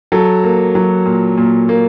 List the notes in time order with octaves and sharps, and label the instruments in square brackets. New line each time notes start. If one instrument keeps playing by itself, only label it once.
[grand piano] F#3 A4
A#3
F#3
A#2
A#2
A#3